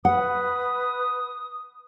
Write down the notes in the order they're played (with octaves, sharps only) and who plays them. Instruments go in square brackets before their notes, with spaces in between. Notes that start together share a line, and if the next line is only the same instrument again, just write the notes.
[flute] B4 [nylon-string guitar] F#5 [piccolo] D#6